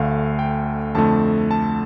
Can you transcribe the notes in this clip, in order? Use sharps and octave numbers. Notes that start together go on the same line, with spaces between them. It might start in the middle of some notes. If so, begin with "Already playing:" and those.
Already playing: D2 D3 A3 F5
G5
F2 D3 A3 A5
A5